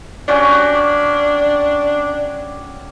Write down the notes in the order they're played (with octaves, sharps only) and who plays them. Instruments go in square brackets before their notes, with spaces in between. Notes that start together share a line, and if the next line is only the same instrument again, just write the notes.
[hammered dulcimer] C#4 F#4 G4 [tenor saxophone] D4